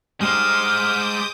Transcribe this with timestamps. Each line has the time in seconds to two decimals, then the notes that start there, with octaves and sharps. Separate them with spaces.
0.21 G3 G#3 C5 D6 D#6 F6 G6